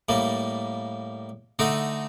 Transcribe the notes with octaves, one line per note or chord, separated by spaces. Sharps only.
A2 G3 A#3
D3 A3 D#4 F#4